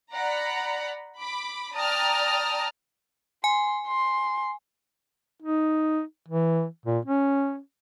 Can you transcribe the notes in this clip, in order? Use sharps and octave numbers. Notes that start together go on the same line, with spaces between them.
D5 F#5 A#5 B5
B5 D6
D5 G5 A5 A#5 D#6 F6
G#5 C6
C6
D#4
E3
A#2
C#4